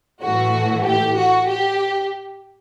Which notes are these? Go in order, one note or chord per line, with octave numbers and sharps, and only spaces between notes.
A2 E3 A3 F#4
G4
F#4
G4